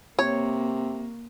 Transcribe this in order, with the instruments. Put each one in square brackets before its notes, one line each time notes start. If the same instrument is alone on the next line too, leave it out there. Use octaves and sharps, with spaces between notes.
[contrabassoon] C3 [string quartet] A#3 [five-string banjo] C#5